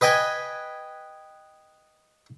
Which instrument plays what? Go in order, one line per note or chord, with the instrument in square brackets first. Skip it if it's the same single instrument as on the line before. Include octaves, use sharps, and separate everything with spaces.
[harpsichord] B4 D#5 G5 G#5